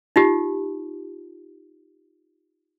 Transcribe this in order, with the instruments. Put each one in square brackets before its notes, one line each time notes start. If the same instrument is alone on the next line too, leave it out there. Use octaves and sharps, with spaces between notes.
[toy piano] D#4 F4 G4